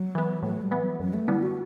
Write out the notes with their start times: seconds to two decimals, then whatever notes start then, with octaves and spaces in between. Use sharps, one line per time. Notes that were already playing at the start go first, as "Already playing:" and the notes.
Already playing: F#3
0.15 E3 B3
0.43 A2 F#3
0.62 G3
0.71 E3 B3
0.81 F#3
1.00 F#2 F#3
1.14 A3
1.28 D3 G3 B3 E4
1.43 F#4